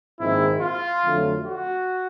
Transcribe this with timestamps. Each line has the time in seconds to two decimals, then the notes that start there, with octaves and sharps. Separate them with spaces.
0.20 A#1 G#2 D#3 G#3 C4 E4
0.61 F4
1.04 F2 D3 F#3 A3
1.45 F#4